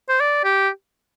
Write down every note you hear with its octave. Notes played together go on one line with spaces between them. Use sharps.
C5
D5
G4